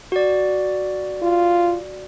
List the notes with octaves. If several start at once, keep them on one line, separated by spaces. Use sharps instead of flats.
F#4 D5
F4